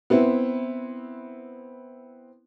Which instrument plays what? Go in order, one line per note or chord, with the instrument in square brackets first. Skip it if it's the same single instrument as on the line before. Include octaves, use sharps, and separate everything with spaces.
[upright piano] B3 C4 E4